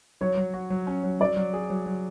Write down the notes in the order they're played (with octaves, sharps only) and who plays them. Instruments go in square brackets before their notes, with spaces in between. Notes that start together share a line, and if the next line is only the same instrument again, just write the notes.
[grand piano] F#3 [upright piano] C#5
[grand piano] F#3
F#4
F#3
C#4
F#3
[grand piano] F#3 [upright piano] D5
[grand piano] F#3
G#4
F#3
F#3